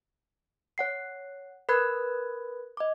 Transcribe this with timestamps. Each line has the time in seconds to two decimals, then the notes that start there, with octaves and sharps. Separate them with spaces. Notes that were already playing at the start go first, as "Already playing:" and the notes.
0.78 C#5 F#5 C7
1.69 A#4 B4 B5 F#6 G#6
2.77 D#5 D6